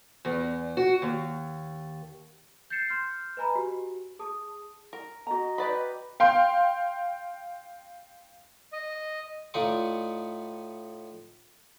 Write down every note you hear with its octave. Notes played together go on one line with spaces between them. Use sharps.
E2
F#4
D#2
G6 A6 C7 C#7 E7
C6 F6 G6
B4 D#5 G#5 A#5 B5
F#4 G4
G#4 A5 D#6
A#4
F#4 D#5 A#5
G4 B4 D5 B5
F5 G5 C6
D#5
A2 D#4 F4 D5 D#5 C#6